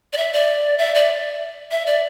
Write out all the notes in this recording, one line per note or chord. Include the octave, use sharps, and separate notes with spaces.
D5
E5
D5
E5
D5
E5
D5